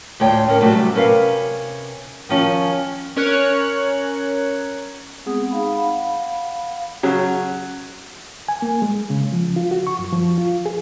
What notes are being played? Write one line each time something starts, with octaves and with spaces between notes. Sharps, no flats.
D2 A2 F4 C#5 G5
A2 C#4 A#4
C3 F#3 G3 A3
C3 C#4 A#4 B4 F5
D#3 F3 C#4
C#4 A#4 C#5 F#6 C#7
G#3 B3 C4 G#4 F#5 D#6
D#4 F5 B5
F5 F#5 B5
C#3 F#3
G#5
A#3
G#3
C#3
F3
F4
F#4
C#6
F#2
F3
F4
G#4